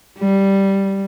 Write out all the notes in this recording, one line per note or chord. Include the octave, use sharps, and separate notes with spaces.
G3